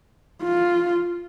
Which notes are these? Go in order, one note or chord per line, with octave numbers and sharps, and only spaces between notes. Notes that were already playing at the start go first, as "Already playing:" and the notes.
F4